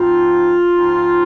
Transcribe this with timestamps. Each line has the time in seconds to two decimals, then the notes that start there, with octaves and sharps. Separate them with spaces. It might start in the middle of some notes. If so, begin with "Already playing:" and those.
Already playing: G#2 F3 C4 D#4 F4
0.73 G#2 F3 C4 D#4